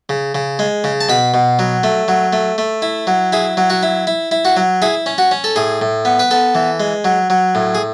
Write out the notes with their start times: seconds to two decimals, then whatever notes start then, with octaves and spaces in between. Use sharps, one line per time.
0.09 C#3
0.35 C#3
0.59 G#3
0.84 C#3
1.01 A5
1.09 B2 B5
1.34 B2
1.59 F#3
1.84 A3
2.08 F#3
2.33 A3
2.58 A3
2.82 E4
3.07 F#3
3.32 E4 G#4
3.57 F#3
3.70 F#4
3.83 E4
4.07 E4
4.31 E4
4.45 F#4
4.56 F#3
4.82 E4 G#4
5.06 C#4
5.18 F#4
5.31 C#4
5.44 A4
5.56 A2 G#4
5.81 A2
6.05 B3
6.19 B4
6.31 B3 A4
6.55 E3
6.80 G#3
7.05 F#3
7.30 F#3
7.55 A2
7.75 G#4